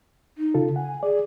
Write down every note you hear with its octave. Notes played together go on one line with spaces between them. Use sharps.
D#4
C#3 F4 A4
F#5 G#5
G#4 D5